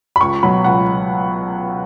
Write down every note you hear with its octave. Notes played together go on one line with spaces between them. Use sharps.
B5
C#2 C#6
B2 F#3 B5
C#2 F#5